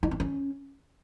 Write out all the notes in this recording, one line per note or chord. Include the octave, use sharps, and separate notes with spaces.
D#4
C4
C#4